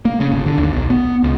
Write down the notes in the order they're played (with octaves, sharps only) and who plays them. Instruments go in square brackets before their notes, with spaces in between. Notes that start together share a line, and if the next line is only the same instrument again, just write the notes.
[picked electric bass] A#3
C#3
G1
D3
D#2
B1
B3
C#2